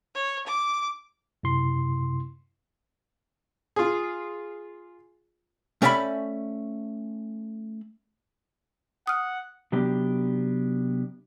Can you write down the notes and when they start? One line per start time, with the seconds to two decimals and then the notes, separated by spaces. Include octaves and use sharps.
0.15 C#5
0.47 D6
1.43 F#2 C3 E4 C6
3.76 F4 G#4
5.82 A3 C#4 D5 E5 F5 B5
9.07 F#5 D#6 F6
9.72 C3 F#3 B3 D4 G4